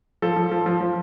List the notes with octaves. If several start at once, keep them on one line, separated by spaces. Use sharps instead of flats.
F3 A4
F3
F3
F3
F3